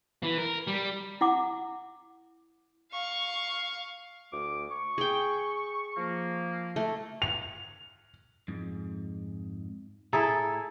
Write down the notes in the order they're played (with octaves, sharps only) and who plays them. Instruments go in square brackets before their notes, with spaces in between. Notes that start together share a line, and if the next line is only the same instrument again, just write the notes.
[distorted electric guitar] E3
A#4
G3
[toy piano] E4 F#5 D6
[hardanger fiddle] F5 C#6
[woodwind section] D2 A3 D6
C#6
[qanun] G#4 G5
[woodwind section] F3 A#3
[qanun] A3
[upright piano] F7
[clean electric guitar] F2 G#2
[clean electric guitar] A2 E5 A#5 [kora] E4 G#4 A4